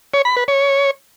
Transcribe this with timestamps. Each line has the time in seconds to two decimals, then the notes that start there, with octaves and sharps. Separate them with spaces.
0.14 C#5
0.25 B5
0.37 B4
0.48 C#5